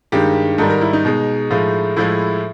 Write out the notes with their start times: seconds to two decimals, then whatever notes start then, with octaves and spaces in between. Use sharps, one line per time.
0.12 G2 D#3 G#3 G4
0.58 G#2 D#3 G3 A4
0.70 A#4
0.81 E4
0.93 D#4
1.05 B2 G#3
1.51 A2 F3 G#3
1.97 A2 F3 G#3 E4